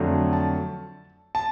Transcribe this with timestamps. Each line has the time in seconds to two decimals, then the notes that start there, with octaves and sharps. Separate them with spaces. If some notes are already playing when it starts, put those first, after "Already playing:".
Already playing: F2 D3 F#3 A3
0.33 A5
1.35 A5